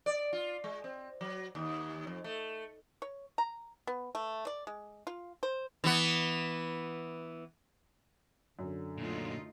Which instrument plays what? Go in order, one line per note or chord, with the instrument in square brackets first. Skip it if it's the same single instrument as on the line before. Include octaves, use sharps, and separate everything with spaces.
[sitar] D5
F4
G#3
C4
F#3
D#2
F2
A3
[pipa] C#5
A#5
B3
A3
D5
G#3
F4
C5
[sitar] E3 B3
[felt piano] F#2 [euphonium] D3
[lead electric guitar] A#2 F#3 [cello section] A3 D#4 F4